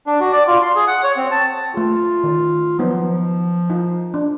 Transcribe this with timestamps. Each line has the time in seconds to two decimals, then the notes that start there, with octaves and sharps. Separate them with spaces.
0.07 D4
0.20 F#4
0.32 D5
0.47 F4
0.62 C6
0.76 G#4
0.87 F#5
1.03 C#5
1.17 C4
1.31 A5
1.74 A3 F4 G#4
2.24 D#3
2.79 F3 F#3 B3 D#4
3.70 D#4 F4
4.14 D4